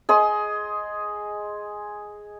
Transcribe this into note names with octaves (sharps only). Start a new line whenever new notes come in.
G#4 D#5 C6